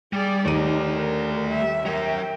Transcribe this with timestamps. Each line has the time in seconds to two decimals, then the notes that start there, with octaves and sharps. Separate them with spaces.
0.13 G3 G#4 D5
0.45 D#2 A3 D#4 D5 D#7
0.91 A#4
1.48 G3 E5
1.86 F#3 A#4 E5 G5